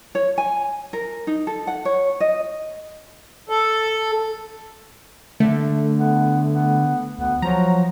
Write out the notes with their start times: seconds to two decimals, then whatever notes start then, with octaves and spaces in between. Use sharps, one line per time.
0.15 C#5
0.38 G#5
0.93 A#4
1.27 D#4
1.47 A4
1.67 F#5
1.85 C#5
2.20 D#5
3.49 A4
5.40 D3 A3
5.98 B3
6.53 B3
7.19 D2 B3
7.42 F3 F#3 A#5